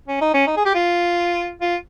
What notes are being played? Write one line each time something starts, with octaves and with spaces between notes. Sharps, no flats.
C#4
D#4
C#4
D#4
G#4
G4
F4
F4